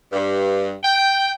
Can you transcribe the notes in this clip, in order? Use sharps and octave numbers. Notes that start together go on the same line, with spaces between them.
G2
G5